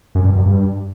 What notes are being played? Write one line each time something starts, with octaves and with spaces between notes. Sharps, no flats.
F#2
G2
F#2
G2